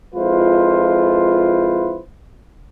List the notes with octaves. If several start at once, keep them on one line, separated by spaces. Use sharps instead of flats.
F2 G#3 E4 F4 B4 C5